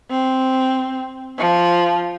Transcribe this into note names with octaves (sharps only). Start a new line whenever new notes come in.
C4
F3